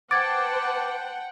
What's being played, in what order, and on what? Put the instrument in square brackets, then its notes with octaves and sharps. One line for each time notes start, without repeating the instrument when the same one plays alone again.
[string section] B4 C5 A5 [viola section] F#5 G5 [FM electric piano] D6 [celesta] G#6 A6